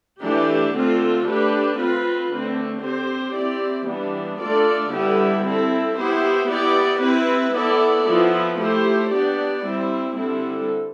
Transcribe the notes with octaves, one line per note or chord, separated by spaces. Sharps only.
E3 A3 D4 G4
D3 A3 C4 F4
A3 D4 G4 B4
C4 F4 B4
D3 A3 C4
C4 G4 C5
C4 E4 G4 D5
E3 G3 B3 D4
A3 D4 F4 A4 D5
D3 G3 B3 E4 G4
C4 E4 A4
B3 E4 G4 C5
B3 E4 G4 D5
C4 E4 B4
B3 E4 A4 D5
F3 B3 E4
A3 E4 G4 C5
B3 D4 G4 D5
G3 C4 E4
D3 G3 C4 E4 A4